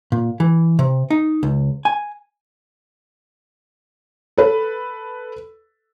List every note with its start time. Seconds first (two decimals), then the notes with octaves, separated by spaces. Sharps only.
0.12 A#2
0.40 E3
0.79 C3
1.10 D#4
1.43 C#2
1.85 G#5
4.38 A4 B4